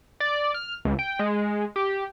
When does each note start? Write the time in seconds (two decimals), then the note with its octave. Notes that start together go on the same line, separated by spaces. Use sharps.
0.20 D5
0.54 F6
0.85 C#2
0.99 G5
1.19 G#3
1.76 G4